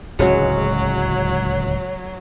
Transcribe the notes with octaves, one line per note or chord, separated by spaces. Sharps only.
D1 C#2 F#3 G#3 C#4 F#4 C#5